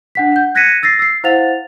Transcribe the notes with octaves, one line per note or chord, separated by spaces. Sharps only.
D4 F#5 B6
F#5 G6
F#6 G#6 A#6 B6 C#7 D#7
E6 A6 A#6 C7
E6 C7
E4 C5 F5 F#5 A6 F7